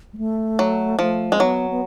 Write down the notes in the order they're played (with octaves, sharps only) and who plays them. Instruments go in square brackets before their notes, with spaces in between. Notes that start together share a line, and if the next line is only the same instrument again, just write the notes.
[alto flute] G#3
A3
[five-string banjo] F#3
[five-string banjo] F3 [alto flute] A3
[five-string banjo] G#3 [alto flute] C#4
[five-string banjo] F#3 [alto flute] B3
[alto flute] B3